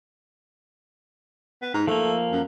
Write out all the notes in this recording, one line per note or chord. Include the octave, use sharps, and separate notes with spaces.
B3
G#2
F3 A3 A#3
F#2